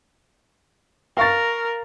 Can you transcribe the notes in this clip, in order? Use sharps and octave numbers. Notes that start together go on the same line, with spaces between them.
A#4 F5 C#6 A6